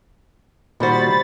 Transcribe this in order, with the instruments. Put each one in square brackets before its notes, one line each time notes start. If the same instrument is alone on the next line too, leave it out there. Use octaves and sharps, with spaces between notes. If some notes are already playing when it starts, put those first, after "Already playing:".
[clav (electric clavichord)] A#2 D#3 F#4 [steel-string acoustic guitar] G3 C5 [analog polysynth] B5 A6